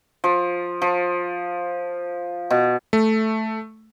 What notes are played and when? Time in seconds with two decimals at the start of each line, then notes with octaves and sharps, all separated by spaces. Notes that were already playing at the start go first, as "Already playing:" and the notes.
0.24 F3
0.82 F3
2.50 B2
2.93 A3